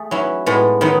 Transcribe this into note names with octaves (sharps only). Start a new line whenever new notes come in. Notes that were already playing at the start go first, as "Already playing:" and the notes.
Already playing: A3 G#4
F#3 C#4 E4 B4
A2 G#3 B3
D#3 F#3 B3 D#4